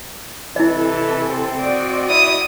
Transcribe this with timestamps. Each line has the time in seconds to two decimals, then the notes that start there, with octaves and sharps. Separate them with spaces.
0.56 C3 E3 E4 A4 D#5
1.30 C4 C6
1.62 F#4 D5 D#5
2.10 E4 D#6